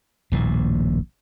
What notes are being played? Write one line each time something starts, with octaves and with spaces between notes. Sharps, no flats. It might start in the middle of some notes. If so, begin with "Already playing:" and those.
D#1 A#1 A2